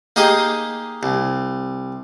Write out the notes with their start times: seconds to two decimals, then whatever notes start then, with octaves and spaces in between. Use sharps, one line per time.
0.16 A#3 D#4 G4 G#4 D#5
1.03 C2